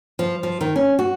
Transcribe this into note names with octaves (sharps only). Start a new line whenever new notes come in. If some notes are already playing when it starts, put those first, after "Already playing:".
F3
F3
D#3
C#4
F#4